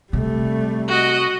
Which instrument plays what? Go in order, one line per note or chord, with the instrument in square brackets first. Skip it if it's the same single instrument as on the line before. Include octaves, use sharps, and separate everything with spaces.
[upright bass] C3 [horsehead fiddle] G3 A3
[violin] F#4 D#5